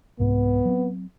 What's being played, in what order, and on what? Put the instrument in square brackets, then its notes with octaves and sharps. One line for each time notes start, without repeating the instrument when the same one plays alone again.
[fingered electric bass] C2 G#2 C3 [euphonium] B3
[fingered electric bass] F#3 C4